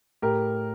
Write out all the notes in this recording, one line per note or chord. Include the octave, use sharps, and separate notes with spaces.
A2 G4 A#4